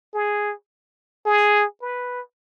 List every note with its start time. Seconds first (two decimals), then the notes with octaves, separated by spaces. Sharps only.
0.14 G#4
1.26 G#4
1.82 B4